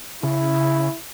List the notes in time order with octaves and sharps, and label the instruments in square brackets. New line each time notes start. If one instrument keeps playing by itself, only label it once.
[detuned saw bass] C#3 [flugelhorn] E4